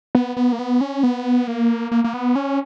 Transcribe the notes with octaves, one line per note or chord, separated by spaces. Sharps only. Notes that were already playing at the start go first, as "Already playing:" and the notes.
B3
B3
A#3
B3
C#4
B3
A#3
A#3
A#3
B3
C#4